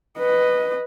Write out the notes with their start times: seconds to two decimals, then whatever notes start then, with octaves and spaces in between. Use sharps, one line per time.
0.18 B4 D#5